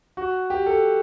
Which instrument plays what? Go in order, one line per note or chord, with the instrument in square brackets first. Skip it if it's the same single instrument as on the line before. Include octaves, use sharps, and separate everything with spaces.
[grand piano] F#4
G4
A4